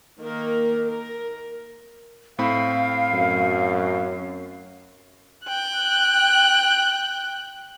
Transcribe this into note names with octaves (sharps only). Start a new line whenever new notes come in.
D#3 A#3 A#4
A#4
A2 C4 F5 B5
F#2
G5 F#6